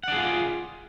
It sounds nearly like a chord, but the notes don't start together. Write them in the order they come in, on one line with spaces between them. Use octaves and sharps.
F#5 D5 G#4 F4